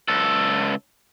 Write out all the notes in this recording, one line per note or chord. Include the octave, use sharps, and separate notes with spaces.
C#2 A4